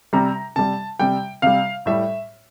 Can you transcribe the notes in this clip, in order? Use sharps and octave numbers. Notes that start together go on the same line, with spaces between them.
C3 G3 A#5
C3 G3 A5
C3 G3 G5
C3 G3 F5
A2 G3 E5